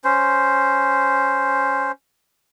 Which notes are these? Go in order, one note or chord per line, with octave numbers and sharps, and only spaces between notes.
C#4 C5